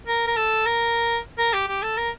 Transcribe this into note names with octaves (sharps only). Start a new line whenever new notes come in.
A#4
A#4
A4
A#4
A#4
G4
G4
A4
A#4